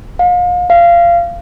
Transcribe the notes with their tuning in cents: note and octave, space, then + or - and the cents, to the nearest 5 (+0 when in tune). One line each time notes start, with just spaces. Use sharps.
F5 +35
F5 -25